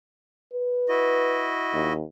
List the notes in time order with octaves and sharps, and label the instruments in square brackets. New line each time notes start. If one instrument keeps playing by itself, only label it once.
[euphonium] B4
[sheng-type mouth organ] E4 F#4 D#5
[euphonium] D#2